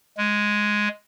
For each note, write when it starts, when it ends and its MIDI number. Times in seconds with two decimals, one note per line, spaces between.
0.18 0.88 56